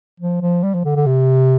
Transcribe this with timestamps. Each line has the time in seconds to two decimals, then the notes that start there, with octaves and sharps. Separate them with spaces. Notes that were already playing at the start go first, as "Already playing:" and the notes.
0.20 F3
0.42 F3
0.64 G3
0.74 F3
0.85 D3
0.96 D3
1.06 C3